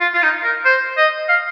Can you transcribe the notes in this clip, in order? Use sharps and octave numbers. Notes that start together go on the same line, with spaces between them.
F4
F4
D#4
A#4
C5
D#5
F5